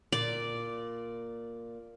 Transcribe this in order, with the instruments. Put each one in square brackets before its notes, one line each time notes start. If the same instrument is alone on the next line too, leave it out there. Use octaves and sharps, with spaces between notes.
[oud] A#2 [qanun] D5